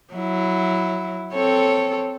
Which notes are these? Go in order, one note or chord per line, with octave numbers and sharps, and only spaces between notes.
F#3 E4
C4 A4 C#5